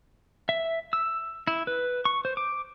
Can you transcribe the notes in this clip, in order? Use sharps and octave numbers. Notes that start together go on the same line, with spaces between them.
E5
E6
E4
B4
C#6
C5
D6